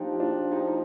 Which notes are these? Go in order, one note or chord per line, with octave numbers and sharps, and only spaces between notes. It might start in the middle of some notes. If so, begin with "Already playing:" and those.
Already playing: F3 D4 D#4 F4 G4
G4
D4 F4
D#4 G4
D#4